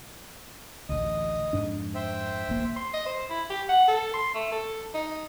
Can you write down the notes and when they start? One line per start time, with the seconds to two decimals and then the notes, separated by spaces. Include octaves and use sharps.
0.89 A1 D2 D#5
1.53 F2 G#2 D4
1.95 C5 E5 G5
2.49 D1 A1 A#3
2.76 C6
2.94 D#5
3.06 C5
3.30 E4
3.50 G4
3.69 F#5
3.88 A4
4.14 C6
4.34 A3
4.52 A4
4.94 D#4